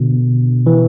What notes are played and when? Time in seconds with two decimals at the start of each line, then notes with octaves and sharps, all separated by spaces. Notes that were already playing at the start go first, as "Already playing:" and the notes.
Already playing: B2 D3
0.66 E3